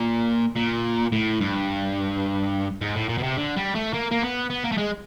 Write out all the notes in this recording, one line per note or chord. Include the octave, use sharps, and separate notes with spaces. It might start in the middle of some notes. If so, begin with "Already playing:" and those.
Already playing: A#2
A#2
A2
G2
G#2
A2
A#2
B2
C3
D3
G3
A3
A#3
A#3
B3
B3
A#3
A3
G#3